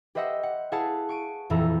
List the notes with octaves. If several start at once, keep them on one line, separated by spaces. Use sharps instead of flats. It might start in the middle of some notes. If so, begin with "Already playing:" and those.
G4 B4 C5 D#5 E5 F#5
F#5
E4 G#4 B4 F5 F#5 A5
C#6 D7 D#7
D#1 F2 E3 E4 E5 A#5